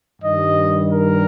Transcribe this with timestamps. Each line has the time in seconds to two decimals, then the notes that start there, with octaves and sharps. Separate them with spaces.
0.21 G2 D#3 G3 D#5
0.90 A#4